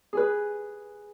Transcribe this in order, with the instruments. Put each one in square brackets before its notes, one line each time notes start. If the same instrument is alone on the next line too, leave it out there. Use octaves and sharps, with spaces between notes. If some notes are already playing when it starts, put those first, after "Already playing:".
[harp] G#4 B4